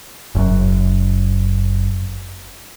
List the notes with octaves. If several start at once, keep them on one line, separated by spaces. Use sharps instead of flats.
F#1 F#2